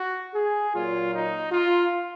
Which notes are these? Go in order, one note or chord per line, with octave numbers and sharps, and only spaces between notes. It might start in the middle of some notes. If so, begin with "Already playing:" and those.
Already playing: F#4
G#4
A#2 F#3 F4
D#4
F4